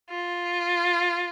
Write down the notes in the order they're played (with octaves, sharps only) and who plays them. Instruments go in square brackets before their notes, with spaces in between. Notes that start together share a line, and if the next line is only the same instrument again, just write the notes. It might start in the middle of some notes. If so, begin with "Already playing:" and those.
[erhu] F4